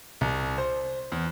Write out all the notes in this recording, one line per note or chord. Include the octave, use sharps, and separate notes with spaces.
C2
C5
E2